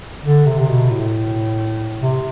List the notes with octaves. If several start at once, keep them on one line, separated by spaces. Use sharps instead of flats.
D3
C3
C3
B2
A2
C3